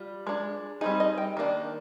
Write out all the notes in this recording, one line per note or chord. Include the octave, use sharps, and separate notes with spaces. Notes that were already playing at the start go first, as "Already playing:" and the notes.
Already playing: G3 F4
G#3 D4
G3 C4 D#4 G#4
D#5
G5
D#3 A#3 D4